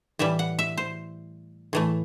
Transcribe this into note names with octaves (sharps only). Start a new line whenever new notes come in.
A2 E3 G3 E5
F#5
E5
C5
A2 E3 A3